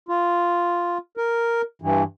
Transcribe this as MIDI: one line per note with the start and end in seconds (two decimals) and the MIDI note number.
0.09 0.98 65
1.17 1.62 70
1.82 2.03 43
1.82 2.03 52